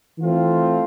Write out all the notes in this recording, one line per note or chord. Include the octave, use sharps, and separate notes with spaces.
E3 A3 C4 F4